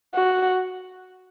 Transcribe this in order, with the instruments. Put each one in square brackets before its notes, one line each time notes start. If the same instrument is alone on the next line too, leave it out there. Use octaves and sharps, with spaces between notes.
[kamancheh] F#4